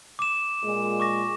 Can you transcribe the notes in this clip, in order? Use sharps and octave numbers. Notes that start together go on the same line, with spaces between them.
D6 E7
A#2 G#3
C#6 D6 A#6